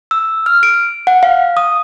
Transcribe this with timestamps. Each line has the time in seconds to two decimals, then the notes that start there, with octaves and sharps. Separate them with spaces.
0.11 E6
0.46 F6
0.63 D7
1.07 F#5
1.23 F5
1.57 D#6